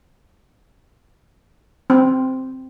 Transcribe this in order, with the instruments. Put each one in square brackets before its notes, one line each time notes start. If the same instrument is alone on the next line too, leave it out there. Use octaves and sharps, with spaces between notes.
[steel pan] C4